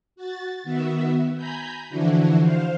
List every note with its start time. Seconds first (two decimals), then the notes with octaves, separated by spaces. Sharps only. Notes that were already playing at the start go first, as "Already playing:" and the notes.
0.16 F#4 A6
0.64 D#3 B3 F#4 E5
1.36 G#5 A#5 B5 G6
1.90 D3 E3 F3 D4 E4 F#4
2.42 C5 F5